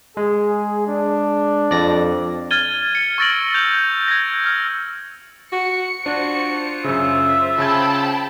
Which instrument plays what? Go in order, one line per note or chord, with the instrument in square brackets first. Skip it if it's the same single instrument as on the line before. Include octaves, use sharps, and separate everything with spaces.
[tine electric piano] G#3 [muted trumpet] G#4
[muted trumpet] D4
[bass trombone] F2 [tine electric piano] D5 A#6
[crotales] F6 G#6 A6 D#7 G7
C#7
C#6 E6 A6 A#6 D7 F#7
G6 F7
G#6 A#6
E6 F6
[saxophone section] F#4 [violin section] C#7
[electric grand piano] D4 [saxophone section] F4 C5 [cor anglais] F#4
[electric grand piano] F#2 C#3 [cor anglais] E5
[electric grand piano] C#3 E6 G#6 [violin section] G5 A5 B5